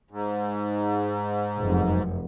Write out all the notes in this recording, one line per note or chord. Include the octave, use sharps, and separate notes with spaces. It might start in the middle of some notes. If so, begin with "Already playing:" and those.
G#2
F1 F#2